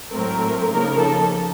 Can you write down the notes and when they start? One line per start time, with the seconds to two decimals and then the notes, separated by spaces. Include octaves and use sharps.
0.11 A2 F#3 A3 C4 A#4
0.70 C#3 F3 A#3 D#4 A#4
0.99 A4